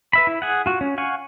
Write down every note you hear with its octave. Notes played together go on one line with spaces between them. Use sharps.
B4 E5 B5
E4
G#4 F#5
F4 F#4
C#4
F5 F#5 G#5 C#6